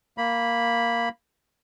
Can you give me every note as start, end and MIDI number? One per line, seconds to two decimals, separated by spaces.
0.18 1.09 58
0.18 1.09 83